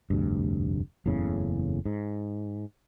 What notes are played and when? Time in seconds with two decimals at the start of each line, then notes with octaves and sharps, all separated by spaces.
0.10 F1 D2 G2
1.06 F#1 E2 A2 C#3
1.86 G#2